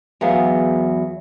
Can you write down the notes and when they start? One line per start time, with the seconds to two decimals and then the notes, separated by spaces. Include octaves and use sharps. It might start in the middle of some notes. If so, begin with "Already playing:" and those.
0.21 E2 F#3 B3 G#4 F5